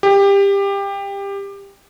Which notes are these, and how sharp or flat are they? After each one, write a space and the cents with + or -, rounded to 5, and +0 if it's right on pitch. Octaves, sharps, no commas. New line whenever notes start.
G4 +20